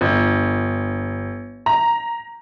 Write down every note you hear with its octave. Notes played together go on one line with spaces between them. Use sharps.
G1
A#5